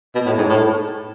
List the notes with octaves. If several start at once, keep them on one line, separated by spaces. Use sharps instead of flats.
B2
A2
G#2
A2